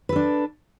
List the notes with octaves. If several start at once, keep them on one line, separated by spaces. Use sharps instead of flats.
D4 A4 B4